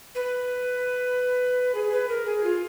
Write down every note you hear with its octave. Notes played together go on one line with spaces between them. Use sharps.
B4
G#4
B4
A#4
G#4
F4